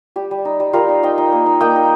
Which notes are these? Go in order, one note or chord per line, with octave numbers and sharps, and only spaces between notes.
G3 G4
G3
D#4
G3
G3 F4 A#4
D#4
D#4 D#5 G5
D#4
A#3
D#4
A#3 D#5 G5
D#4